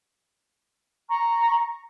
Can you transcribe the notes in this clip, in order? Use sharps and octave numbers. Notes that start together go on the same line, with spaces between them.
A#5 C#6